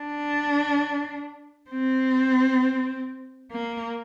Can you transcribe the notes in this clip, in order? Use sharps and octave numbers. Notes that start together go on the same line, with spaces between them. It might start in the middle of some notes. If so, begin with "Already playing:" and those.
Already playing: D4
C4
A#3